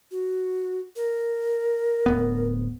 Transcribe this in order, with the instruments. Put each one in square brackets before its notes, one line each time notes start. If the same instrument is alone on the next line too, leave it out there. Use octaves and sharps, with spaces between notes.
[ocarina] F#4
A#4
[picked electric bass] D1 B3